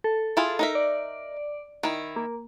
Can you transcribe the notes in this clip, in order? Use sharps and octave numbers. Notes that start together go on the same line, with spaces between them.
A4
E4 F4 G#4
D#4 A#4 E5
D5
D#3 E4
A#3